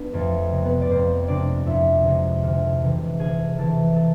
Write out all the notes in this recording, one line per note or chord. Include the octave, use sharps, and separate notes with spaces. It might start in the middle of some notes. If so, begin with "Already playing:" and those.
Already playing: B3 D4 B4
F2 A3 A4
C3 G#3
B3 B4
D5
F2 C4 C5
C3 G#3 D4 D5
F2 E4 E5
C3 G#3
D2
C3 E3
D2 G#4 G#5
C3 E3 A4 A5
A4 A5